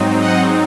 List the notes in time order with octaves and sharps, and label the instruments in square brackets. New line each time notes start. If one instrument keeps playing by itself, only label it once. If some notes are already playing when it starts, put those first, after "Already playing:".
Already playing: [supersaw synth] G#2 F#3 C4 D#4
D#5 F#5